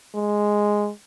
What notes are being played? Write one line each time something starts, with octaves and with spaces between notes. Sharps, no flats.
G#3